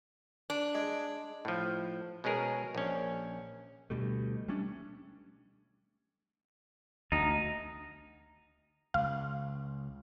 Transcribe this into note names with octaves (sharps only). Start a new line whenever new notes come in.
D4
G#3
A2 F3
B2 G#3 C#4 G#4 A#4
A#1 C#4
D2 B2 G3 A3
G3 A3 C#4 D4
D2 D#4
C#2 F5